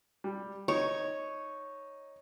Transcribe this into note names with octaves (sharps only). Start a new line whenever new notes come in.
G3
D#4 C#5